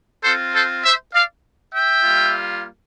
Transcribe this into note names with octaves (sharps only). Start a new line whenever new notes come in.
C4 F4 A4 C5
A4 C5
C5 E5
D5 F5
E5 G5
G3 A#3 F4